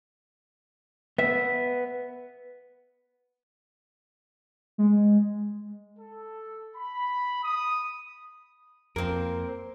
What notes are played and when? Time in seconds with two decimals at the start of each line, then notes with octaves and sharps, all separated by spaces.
1.18 B3 E5 B6
4.78 G#3
5.99 A4
6.76 B5
7.44 D#6
8.96 F2 A#3 C4 A#4